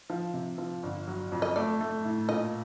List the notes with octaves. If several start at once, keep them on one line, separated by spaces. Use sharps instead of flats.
F3
C3
F3
G1
F#3
F2
D#5
A3 D5
A3
A2
A#2 D#5